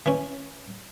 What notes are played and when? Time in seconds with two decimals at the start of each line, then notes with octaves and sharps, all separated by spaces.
0.06 E3 C#4